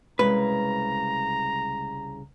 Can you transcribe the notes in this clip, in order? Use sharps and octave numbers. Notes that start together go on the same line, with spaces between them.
C2 C#3 G#3 B4 A#5